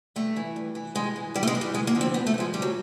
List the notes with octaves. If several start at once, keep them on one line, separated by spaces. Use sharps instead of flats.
G2 A3
E3
G2
E3
G2 G#3
E3
G2 G3
A3
G#3
E3
G3
D2 G#3
A#3
D3 F3
C4
D2 B3
A3
D3
F3 G#3
D2 G3
F#3